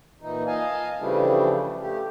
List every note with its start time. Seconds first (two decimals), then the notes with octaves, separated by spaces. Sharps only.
0.21 A#2 E3 D#4
0.47 D#5 F5 G#5 A5
0.99 C#3 E3 F3 G3 A3 D4
1.81 A3 G4